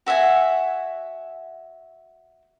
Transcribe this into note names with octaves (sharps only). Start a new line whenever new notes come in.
F#4 E5 F#5 G#5